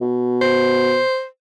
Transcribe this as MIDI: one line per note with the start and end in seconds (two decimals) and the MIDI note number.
0.01 0.99 47
0.42 1.25 72